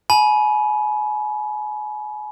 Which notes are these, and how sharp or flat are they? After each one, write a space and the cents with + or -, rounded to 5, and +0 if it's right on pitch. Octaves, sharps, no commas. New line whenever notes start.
G#5 +35 B5 -25